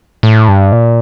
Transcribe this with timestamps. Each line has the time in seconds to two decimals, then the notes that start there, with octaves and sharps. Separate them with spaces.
0.23 A2
0.48 G2
0.72 A#2